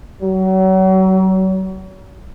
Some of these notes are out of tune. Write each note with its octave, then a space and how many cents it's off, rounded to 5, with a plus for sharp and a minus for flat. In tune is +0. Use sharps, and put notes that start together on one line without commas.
F#3 +35